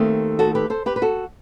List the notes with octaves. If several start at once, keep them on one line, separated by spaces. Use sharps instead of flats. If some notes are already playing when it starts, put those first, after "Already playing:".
Already playing: D#2 D#3 A3 C4
F#4 A4
G4 B4
A4 C5
G4 B4
B4
F#4 A4